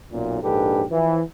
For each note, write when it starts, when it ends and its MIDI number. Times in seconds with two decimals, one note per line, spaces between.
0.12 0.40 35
0.12 0.40 42
0.12 0.40 46
0.43 0.84 34
0.43 0.84 44
0.43 0.84 62
0.43 0.84 67
0.43 0.84 69
0.43 0.84 71
0.90 1.19 52
0.90 1.19 53